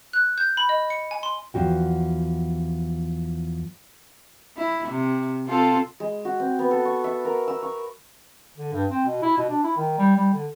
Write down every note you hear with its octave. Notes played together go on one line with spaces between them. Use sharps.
F#6
G6
B5
D#5
C#7
G#5
C6
E2 F3 F#4 G5
E4
C3
C4 F4 A4
G#3
F#4
C4
B3
A4
C#6
E5
A#4
E6
C#6
D3
G2
C4
B2
E4
B2
D4
E4
D#3
G3
G3
D3